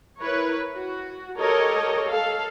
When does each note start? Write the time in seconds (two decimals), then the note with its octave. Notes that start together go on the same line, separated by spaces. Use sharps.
0.21 E4 A#4 B4 C#5
0.73 F#4
1.36 G4 A4 A#4 C#5 D#5
2.07 A4 F5